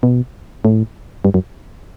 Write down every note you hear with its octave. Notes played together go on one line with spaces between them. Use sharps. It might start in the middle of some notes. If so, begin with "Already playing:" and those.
B2
A2
G2
F#2